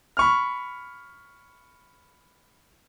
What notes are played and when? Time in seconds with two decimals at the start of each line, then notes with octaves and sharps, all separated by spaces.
0.17 B5 C#6 F6